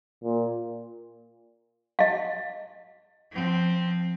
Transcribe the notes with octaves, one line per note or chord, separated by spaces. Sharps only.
A#2
D#5 F5
F3 C4